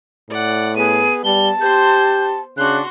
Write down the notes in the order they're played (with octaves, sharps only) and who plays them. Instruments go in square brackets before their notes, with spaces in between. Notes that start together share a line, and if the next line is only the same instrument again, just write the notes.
[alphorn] A2 [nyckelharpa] D5 F#5
[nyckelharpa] B3 B4 [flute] G#4 [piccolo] D#7
[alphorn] G3 [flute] A5 [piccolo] G7
[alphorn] G4 [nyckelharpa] C5 C6 [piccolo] G6
[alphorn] C#3 [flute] D4 [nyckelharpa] F#4 C6 [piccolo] F#6